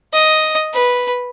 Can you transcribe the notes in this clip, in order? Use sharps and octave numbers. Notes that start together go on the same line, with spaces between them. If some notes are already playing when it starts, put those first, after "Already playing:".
D#5
B4